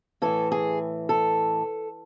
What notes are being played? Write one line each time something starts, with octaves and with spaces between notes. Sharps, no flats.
A2 E3 A4
G#4
A4